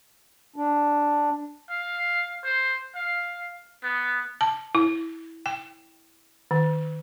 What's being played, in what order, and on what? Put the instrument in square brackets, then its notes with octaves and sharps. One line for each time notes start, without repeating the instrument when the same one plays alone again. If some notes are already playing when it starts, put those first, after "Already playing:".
[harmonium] D4
[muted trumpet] F5
C5
F5
B3
[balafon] A5
E4
G5
D#3